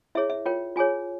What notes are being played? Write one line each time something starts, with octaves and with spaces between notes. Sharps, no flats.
E4 G#4 C#5 E5
E5
F4 A#4 C#5 G5
F4 G#4 C#5 G#5